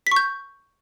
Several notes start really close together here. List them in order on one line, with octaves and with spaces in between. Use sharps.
B6 C#6 G6